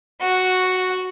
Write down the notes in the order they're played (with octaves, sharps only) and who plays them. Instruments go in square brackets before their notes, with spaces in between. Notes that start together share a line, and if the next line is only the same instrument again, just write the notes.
[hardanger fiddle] F#4